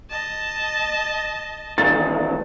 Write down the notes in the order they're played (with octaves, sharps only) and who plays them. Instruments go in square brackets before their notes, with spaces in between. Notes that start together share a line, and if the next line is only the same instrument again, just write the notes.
[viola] D#5 A5
[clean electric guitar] E2 A#2 D#3 [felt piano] A6